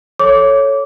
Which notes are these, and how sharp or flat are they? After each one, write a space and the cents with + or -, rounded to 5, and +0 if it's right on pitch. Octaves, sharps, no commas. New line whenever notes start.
A4 +0 C#5 +0 D6 -20